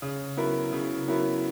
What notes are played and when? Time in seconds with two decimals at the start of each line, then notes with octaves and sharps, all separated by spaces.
0.02 C#3
0.37 F#3 B3 E4 A#4
0.72 C#3
1.08 F#3 B3 E4 A#4